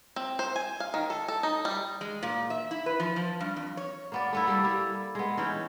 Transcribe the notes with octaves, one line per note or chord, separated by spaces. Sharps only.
C4
C5
G#5
F5
D#3
A4
A4
D#4
G3
G#3
A#2
E5
E4
B4
F3
F3
G2
F2
C#5
A#3 B3 D5
A3 B3 E4
G3 A#3 A4
G3 E4
G#3 B3
E3 C#4 D#4 G5